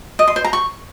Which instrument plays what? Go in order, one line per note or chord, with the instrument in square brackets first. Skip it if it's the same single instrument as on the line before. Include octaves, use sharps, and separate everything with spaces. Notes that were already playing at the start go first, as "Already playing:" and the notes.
[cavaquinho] D#5
C6
C5
A#5
C#6